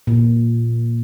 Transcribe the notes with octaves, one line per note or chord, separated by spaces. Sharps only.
A#2